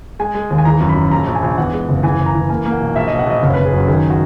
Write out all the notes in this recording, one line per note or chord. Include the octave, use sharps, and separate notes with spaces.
G#3 G#5
G#3
D#2
G#5
E3 A#5
F#2
B5
F#2
A#1 A#5
A#1
G#5
A#1
E2 F#5
G#3
F#1
E3 G#5
F#1
A#5
E3
A#3 G#5
A#3
F#5
B1
A#1 E5
D#5
A#1
F#5
A#1 D#5
F#1 C#5
B4
F#1
G#4
F#2 F#4
D#3 G#4
F#4